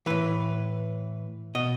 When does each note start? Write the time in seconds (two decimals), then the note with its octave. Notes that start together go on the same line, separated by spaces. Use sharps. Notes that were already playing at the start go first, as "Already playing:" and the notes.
0.06 A2 E3 B4
1.55 B2 D#5